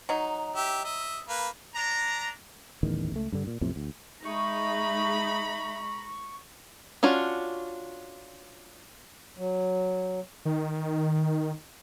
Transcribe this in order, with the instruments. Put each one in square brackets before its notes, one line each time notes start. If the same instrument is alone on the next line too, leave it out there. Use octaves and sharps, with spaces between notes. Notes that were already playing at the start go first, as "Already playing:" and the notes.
[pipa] F#3 D#4
[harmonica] G4 E5
D#5 E5
A#3 B4
[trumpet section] D4 A#5
[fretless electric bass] D1 A1 E2 D#3
C#2 A3
G2 D3
A#2
B1 F2 A2 C3
D2
[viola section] G#3 D#4 [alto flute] E5 [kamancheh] A#5 B5 [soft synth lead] C#6
[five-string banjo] C#4 D4 F4 F#4
[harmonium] F#3
[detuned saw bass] D#3